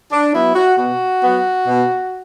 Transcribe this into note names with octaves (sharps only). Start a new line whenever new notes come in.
D4
F#3 B3 E4
F#4
B2 F#4
F#3 B3
B2